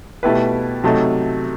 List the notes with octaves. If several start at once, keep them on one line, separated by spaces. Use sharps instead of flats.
B2 A3 E4 G4 B4
C3 F#3 A3 D#4 A4